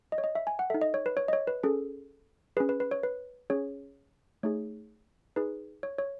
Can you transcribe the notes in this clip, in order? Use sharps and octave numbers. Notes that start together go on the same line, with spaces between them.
D#5
C#5
D#5
E5
G#5
F#5
D#4 A4 E5
D#5
C#5
B4
C#5
D#5
C#5
B4
C#4 G#4 A4
C#4 G#4 B4
B4
B4
C#5
B4
C#4 G#4 C#5
A3 D#4 G#4 C#5
D#4 G#4 B4
C#5
C#5